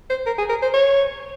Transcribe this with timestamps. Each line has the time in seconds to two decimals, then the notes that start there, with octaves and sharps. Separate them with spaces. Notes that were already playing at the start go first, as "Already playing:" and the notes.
0.10 C5
0.26 A#4
0.38 G#4
0.49 A#4
0.62 C5
0.74 C#5